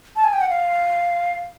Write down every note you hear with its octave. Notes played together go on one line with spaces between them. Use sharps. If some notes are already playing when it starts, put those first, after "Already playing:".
A5
G#5
G5
F#5
F5